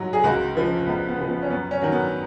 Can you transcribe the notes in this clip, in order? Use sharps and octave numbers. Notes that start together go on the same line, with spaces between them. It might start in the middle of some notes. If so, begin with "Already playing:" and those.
Already playing: G#2 F#3
G#4
C#2 F#4
C#3 F3
C#2 B3
B3
C#3 F3
B3
C#4
F#2 B3
C#4
D#3 F#3
B3